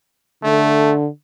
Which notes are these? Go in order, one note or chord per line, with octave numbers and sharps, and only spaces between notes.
D3 A3